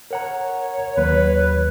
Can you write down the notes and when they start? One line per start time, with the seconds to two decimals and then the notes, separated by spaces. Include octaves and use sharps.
0.11 A#4 C#5 F#5 A#5
0.97 D#2 F#3 B4